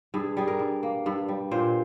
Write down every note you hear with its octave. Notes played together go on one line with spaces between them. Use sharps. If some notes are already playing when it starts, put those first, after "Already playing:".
G2 G#4
G3 G#4
A#4
G2
A#3
G2
G3
A#2 C5